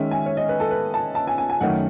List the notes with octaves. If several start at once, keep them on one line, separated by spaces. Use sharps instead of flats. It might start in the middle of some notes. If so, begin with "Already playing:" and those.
Already playing: D#3 G#3 C#4 E5
G#5
C#5
D#5
B4
A4
B4
A5
A5
G#5
G#5
G#5
F#2 D#3 A3 C#4 F#5